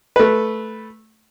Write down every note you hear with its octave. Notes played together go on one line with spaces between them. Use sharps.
A3 B4